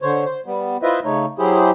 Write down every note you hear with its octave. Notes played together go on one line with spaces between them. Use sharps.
D3 C5 C#5
C5
G3 B3
E4 F4 B4 C5 D#5 E5
C#3 A3 D#4 C#5
F#3 E4 G4 G#4 C5